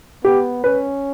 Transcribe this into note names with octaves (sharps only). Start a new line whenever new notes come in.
B3 G4
C#4 B4